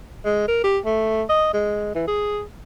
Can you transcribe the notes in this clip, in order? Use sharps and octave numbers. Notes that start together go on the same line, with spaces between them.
G#3
A#4
G4
A3
D#5
G#3
E3
G#4